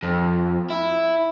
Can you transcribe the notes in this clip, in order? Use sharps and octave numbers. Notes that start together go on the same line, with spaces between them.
F2
E4